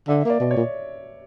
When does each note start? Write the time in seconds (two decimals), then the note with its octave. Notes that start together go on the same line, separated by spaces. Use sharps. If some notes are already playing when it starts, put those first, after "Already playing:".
0.08 D3 E5
0.25 A#3 D5
0.40 B2
0.51 C#5
0.57 A#2